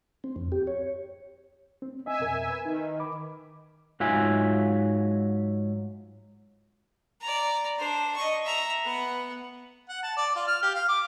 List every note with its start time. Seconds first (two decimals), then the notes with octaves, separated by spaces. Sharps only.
0.24 C4
0.36 F2
0.52 G4
0.67 C#5
1.82 C4
2.06 C4 D#5 E5 G#5
2.20 F2 B2 A#4
2.50 B4
2.65 D#3
3.00 B5 D6
4.00 G#2 F#3 F4 E5 G#5
7.21 D5 A#5
7.78 D4 C5
8.16 D#5 C#6
8.45 E5 A#5
8.85 B3 F#5
9.89 F#5
10.03 A5
10.17 D5
10.35 F4
10.47 F6
10.63 G4
10.75 F5
10.88 D6